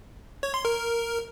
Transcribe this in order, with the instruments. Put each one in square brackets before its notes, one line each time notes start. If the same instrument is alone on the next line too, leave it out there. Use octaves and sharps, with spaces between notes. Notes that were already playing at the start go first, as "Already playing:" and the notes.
[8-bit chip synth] C#5
C6
A#4